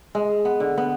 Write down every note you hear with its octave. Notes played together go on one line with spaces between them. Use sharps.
G#3
B3
D3
B3